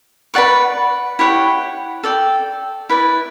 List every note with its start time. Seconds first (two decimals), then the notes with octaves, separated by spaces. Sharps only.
0.34 B4 D5 F#5 C#6
1.19 E4 G4 C#5 F#5
2.04 A4 D5 G5
2.89 E4 B4 D5